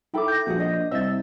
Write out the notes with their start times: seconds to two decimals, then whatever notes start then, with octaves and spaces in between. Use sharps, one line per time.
0.14 D#4 E4 A4 G5 B5 D6
0.28 G6 A#6
0.46 A#1 F#4 G#4 F#5
0.60 D4 D#5
0.91 C2 C5 D#5 E5 E6 A6